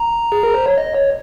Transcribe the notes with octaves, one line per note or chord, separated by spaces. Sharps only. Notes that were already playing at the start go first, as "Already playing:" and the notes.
Already playing: A#5
G#4
A#4
C5
C#5
D#5
C#5